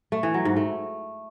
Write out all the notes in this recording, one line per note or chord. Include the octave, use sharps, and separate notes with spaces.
A3
E3
F#3
G#2
A3